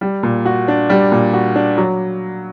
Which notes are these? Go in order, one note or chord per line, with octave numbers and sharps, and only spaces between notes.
G3
A#2
F#4
D4
G3
A#2
F#4
D4
F#3